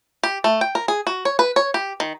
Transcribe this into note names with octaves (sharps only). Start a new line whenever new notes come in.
G4
A3
G5
A#4
G#4
F#4
C#5
B4
C#5
G4
D#3